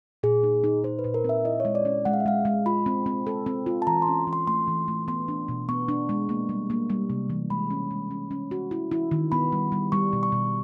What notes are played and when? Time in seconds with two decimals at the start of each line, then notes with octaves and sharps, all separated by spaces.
0.23 A#2 G#4
0.43 D#4
0.64 D#4
0.84 D#4 C5
0.99 B4
1.04 A#2
1.14 A#4
1.24 C4 E5
1.45 E4 D#5
1.60 C#5
1.65 G#3
1.75 D5
1.85 C#4
2.05 G#3 F#5
2.13 F5
2.20 E5
2.26 G#3 F5
2.45 G#3
2.66 F4 B5
2.86 C4
3.06 C4
3.26 A4
3.46 C4
3.66 F4
3.82 A5
3.87 E3 A#5
4.02 C6
4.07 C#4
4.27 E3
4.33 C6
4.47 A3 C6
4.68 E3
4.88 A3
5.08 B3 C6
5.28 D4
5.48 B2
5.69 B3 C#6
5.88 D4
6.09 G#3
6.29 A#3
6.49 G3
6.70 A#3
6.90 G3
7.10 C3
7.30 E3
7.50 G#3 B5
7.70 C#4
7.91 G#3
8.11 C#4
8.31 C#4
8.51 F#4
8.71 E4
8.91 E4
9.11 D#3
9.32 B3 B5
9.52 G3
9.72 G3
9.92 G3 C#6
10.13 B2
10.23 C#6
10.32 B2